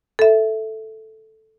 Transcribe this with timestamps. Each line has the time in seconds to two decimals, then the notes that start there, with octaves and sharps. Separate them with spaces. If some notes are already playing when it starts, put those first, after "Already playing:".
0.19 A4 E5